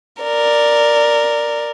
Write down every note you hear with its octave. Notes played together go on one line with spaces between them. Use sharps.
A#4 D5